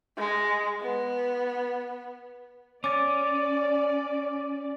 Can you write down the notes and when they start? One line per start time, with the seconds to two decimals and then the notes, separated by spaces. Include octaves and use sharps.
0.17 G#3
0.82 B3
2.84 C#4 D5 D6 A6